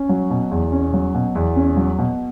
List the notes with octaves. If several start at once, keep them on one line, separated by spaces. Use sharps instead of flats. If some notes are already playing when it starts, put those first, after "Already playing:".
Already playing: C#4
F#3
B2
E2
C#4
F#3
B2
E2
C#4
F#3
B2